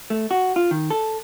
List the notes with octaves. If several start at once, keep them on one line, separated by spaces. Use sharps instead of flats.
A3
F#4
F4
D#3
A4